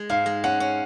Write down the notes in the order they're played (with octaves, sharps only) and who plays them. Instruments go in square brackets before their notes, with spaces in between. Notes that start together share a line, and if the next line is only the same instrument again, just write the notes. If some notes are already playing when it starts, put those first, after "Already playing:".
Already playing: [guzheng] G#3
[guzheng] G#2 [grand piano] F5
[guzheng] G#3
[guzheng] C#4 [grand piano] F#5
[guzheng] C#4